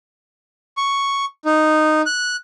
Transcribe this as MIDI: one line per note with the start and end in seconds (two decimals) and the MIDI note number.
0.77 1.25 85
1.45 2.02 63
2.06 2.36 90